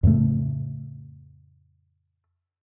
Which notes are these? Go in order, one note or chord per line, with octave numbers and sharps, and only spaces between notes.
F2 A2 C#3 A3